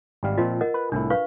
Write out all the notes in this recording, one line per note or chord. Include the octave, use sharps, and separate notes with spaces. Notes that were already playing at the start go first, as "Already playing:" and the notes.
G#1 G3 F5
A#2 F3 C4 F4 D#5
A#4 D#5 F#5
B4
C2 A2 D4 E4
B4 F5 C#6